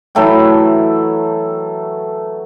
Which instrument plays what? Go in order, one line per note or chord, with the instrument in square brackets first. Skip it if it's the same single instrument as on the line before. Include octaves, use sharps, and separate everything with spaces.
[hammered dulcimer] E3 F#3 A3 G5